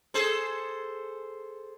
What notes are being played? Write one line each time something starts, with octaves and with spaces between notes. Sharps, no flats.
G#4 A4 C5